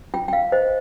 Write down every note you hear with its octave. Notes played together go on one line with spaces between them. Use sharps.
F4 G5
G5
F5
C5 D#5